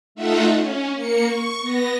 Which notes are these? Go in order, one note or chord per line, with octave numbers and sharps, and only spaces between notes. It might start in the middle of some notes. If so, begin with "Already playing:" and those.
A3 D#4 F4 E5 F#5
C#4
A#3 C#7
C#6
B3 A#6